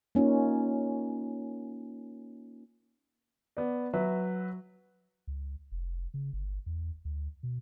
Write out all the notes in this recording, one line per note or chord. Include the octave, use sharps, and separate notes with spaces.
A#3 C#4 D#4 F4
B3 D5
F#3 B4 E5
C#2
F1
C#3
G1
E2
D2
B2